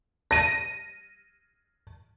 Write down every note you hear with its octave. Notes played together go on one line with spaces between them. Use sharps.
A#6 D#7